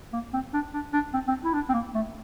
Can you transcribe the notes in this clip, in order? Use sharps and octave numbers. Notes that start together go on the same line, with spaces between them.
A#3
C4
D4
D4
D4
C4
C4
E4
D4
C4
A#3
A3